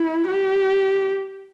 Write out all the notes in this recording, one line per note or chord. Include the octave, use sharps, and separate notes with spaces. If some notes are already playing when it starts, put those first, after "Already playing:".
Already playing: E4
G4